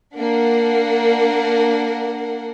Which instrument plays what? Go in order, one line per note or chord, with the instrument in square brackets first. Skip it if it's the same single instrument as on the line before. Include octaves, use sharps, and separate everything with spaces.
[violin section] A#3 D4 A#4 F#5